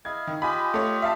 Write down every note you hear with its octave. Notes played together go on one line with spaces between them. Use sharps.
E4 D#5 F5 G#6
D#3
F4 G4 D#5 G#5 B5
A3 C#5
E5 F5 A5